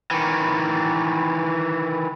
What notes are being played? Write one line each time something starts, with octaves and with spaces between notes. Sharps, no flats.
D#3 E3